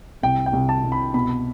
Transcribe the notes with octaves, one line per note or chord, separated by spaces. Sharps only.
C2 G5
G5
C2
A5
C2
B5
B2 B5